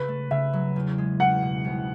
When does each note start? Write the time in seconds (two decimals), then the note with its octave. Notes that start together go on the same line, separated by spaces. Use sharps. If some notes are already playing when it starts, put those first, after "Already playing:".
Already playing: C#3 B4
0.08 A3
0.31 C#3 E5
0.53 F#3
0.76 E2
0.98 G#3
1.20 E2 F#5
1.42 B2
1.65 C2